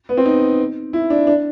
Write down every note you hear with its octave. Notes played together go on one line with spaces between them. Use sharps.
B3
C4
D#4
E4
D4
D4